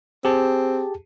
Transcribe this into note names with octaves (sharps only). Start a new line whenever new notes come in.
C4 G4 G#4 A5